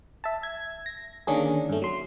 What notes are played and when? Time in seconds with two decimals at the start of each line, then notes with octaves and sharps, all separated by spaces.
0.24 E5 A5
0.43 G#6
0.86 A#6
1.27 D3 D#3 A#3 C#4 D4 G#4
1.69 G2 A3
1.82 F#3 C6